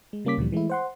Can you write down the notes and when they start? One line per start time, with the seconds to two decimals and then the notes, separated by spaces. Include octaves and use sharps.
0.13 G#3
0.25 C#3 G3 A#3 C#4 D6 B6
0.37 D2 A#2 D3 E3 F3 G3
0.52 E3 G#3 A3 E4
0.70 C5 F#5 C6